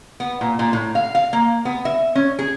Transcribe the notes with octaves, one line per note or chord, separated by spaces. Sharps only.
B3
A#2
A#2
A2
F5
F5
A#3
B3
E5
C#4
G#4